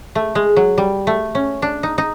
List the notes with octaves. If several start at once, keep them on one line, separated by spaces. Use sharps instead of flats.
A3
G#3
F#3
G3
A3
C#4
D4
D#4
D#4